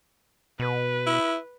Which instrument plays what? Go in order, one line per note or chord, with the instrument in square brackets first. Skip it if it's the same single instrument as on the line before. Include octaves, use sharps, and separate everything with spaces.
[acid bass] B2 [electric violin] B4
[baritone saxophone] E4